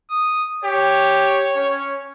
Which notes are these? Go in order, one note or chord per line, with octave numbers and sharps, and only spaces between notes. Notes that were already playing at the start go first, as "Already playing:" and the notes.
D#6
G4 C#5
C#4